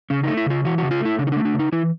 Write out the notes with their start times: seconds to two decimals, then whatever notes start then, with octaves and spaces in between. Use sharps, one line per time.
0.10 C#3 C#4
0.23 A3 D#4
0.37 E4
0.46 C#3 F4
0.65 E3 F#4
0.78 F#4
0.83 C#3
0.91 F4
1.01 A3 E4
1.18 C#3 D4
1.27 D#4
1.32 D4
1.37 A3
1.45 D4
1.54 C#3
1.59 D#4
1.72 E3 E4